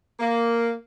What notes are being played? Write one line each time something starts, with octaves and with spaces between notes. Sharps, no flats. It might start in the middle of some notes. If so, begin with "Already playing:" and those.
A#3